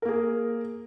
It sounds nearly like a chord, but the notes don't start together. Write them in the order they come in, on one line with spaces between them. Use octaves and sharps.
A#4 A#3 G#4